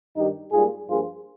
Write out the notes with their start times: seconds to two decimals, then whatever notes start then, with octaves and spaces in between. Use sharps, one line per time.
0.16 G2 D#3 G3 D#4 G4
0.52 G#2 G3 A#3 F4 G#4
0.88 G2 F3 A#3 F4 G#4